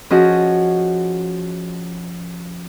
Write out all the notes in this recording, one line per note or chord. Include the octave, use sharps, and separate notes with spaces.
F3 C#4 F#4 G#4 D#5